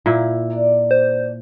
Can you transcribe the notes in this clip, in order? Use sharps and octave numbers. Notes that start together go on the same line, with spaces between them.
A#2 E4
D4 D5 A#5
C5